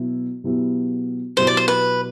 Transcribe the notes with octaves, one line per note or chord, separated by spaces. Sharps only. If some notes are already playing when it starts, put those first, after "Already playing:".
Already playing: B2 F#3 B3 E4
B2 F#3 B3 E4 G4
B2 F#3 B3 E4 G4 C5
D5
C5
B4